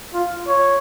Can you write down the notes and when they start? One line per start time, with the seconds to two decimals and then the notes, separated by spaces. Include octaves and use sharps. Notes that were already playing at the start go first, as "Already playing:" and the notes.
0.14 F4
0.48 C#5